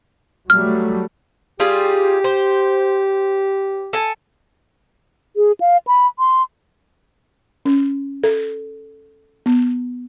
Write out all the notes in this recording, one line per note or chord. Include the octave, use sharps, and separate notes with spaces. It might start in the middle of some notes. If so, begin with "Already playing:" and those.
F#3 G3 A3 F6
G3 F4 G4 G#4
C5
A4 G#5
G#4
F5
B5
C6
C#4
A4
B3